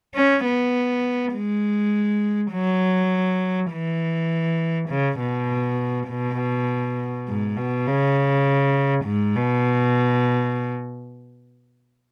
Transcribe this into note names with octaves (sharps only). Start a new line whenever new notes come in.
C#4
B3
G#3
F#3
E3
C#3
B2
B2
G#2
B2
C#3
G#2
B2